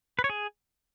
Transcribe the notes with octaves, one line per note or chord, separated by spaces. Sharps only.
B4
C#5
G#4